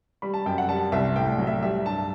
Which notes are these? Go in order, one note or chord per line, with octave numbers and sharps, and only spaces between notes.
G3 B5
A5
F#2 G5
F#5
G3 A5
C2 E5
A2 G5
F#3
E5
G3 E5
G2 A5